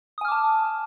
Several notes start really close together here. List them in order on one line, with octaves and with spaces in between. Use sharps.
D#6 G#5 F6 D6 A5